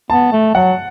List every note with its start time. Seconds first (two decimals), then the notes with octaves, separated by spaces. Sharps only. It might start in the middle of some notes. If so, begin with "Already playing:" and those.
0.10 B3 A5
0.32 A3
0.55 F#3 F#5